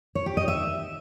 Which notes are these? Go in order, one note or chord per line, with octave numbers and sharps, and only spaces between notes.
C#5
G4
D#5
E5